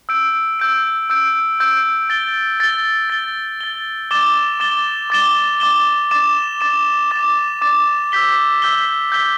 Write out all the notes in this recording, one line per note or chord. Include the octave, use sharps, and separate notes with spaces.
E6 G6 D7
E6 G6 D7
E6 G6 D7
E6 G6 D7
A6 G7
A6 G7
A6 G7
A6 G7
D6 A6 E7 G7
D6 A6 E7 G7
D6 A6 E7 G7
D6 A6 E7 G7
D6 A6 E7
D6 A6 E7
D6 A6 E7
D6 A6 E7
E6 G6 B6 G7
E6 G6 B6 G7
E6 G6 B6 G7